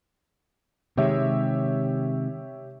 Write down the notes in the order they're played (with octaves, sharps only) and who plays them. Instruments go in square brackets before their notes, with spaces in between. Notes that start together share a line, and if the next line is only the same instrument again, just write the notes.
[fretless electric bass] C3 D#3 G#3 [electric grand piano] G4 C#5 E5